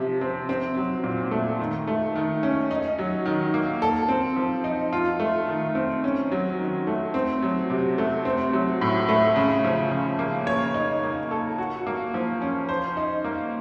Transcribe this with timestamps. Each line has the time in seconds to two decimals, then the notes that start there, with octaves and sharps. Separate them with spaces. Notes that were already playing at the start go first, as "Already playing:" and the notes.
Already playing: C3 F3
0.21 C4
0.49 C4
0.77 F#3
1.04 A#2
1.31 A3
1.59 D#3
1.87 A3
2.15 D#3
2.43 C#4
2.71 D#4
2.99 F#3
3.25 D#3
3.54 A#3
3.82 A4
4.09 C4
4.36 F3
4.64 D#4
4.93 F4
5.20 A3
5.48 D#3
5.75 C4
6.04 C#4
6.32 F#3
6.59 D#3
6.87 A3
7.14 C4
7.42 F#3
7.70 C3
7.98 A3
8.25 C4
8.53 F#3
8.81 A2
9.09 A3
9.36 C#3
9.65 F3
9.91 C#3
10.19 A#3
10.47 C#5
10.74 D#4
11.03 A#3
11.31 A4
11.58 F#4
11.87 A#3
12.14 F3
12.42 C#4
12.69 C5
12.97 D#4
13.24 A#3